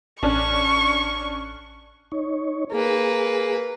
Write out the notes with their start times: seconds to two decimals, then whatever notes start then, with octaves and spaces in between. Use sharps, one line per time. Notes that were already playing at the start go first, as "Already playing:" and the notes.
0.23 A1 C#4 D4 C#6 F6 F#6
2.12 D#4 C#5
2.72 A#3 G#4 B4